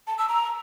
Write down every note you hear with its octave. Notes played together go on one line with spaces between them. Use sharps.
A5
E6
A#5